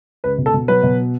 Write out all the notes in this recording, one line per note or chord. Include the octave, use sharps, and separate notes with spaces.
C#2 B4
B2
A4
B2
F#3 B4
B2